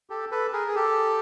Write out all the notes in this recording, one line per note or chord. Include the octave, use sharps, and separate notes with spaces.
G4 A4
A4 B4
G#4 A#4
G#4
G4 A4